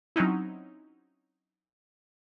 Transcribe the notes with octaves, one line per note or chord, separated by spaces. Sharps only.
F#3 C4 C#4 D#4 E4